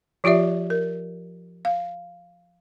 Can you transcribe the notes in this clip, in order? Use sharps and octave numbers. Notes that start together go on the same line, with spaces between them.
F3 F4 G4 D5 E5
A#4
F5